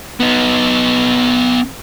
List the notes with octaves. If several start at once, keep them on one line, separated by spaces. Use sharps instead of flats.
B3 D#4